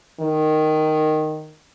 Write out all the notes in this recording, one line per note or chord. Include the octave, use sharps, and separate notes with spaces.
D#3